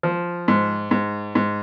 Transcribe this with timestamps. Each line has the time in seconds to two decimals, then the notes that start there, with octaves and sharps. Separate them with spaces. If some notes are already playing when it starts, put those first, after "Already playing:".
0.03 F3
0.48 G#2
0.91 G#2
1.35 G#2